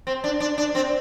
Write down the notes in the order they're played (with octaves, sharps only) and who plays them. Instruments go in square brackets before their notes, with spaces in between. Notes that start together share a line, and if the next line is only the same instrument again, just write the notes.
[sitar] C4
D4
D4
D4
C4